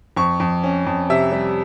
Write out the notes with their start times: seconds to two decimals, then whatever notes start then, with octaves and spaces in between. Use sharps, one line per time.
0.16 F2 C#6
0.40 F2
0.64 C#4
0.87 F2
1.10 C3 E5
1.32 G3